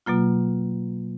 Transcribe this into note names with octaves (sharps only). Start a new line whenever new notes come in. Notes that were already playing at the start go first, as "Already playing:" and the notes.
B2 F#3 A#3 F4